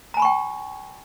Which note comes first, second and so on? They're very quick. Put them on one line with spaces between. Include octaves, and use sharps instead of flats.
A#5 G#5 B5 C#6 G5